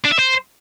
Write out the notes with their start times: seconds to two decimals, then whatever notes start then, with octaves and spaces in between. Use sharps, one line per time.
0.05 D4
0.12 E5
0.19 C5